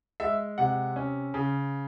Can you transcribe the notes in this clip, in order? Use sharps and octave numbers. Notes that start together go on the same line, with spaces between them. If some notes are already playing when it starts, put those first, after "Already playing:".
G#3 E5
C3 F#5
C#4
C#3